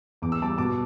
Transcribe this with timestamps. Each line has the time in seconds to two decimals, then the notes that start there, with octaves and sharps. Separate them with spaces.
0.22 E2 D6
0.32 E6
0.41 G3 A5 D6
0.58 B2 A5 D6